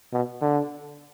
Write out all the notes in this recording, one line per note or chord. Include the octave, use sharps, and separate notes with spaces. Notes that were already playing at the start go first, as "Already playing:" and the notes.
B2
D3